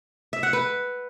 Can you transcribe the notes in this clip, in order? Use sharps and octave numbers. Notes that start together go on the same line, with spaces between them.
E5
F#5
B4